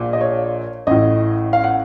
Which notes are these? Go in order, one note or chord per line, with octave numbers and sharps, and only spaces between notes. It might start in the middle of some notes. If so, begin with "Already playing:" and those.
Already playing: A#1 A#2
D#5
C#5
A1 A2 D#5
F5
F#5